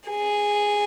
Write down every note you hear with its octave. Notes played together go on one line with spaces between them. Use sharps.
G#4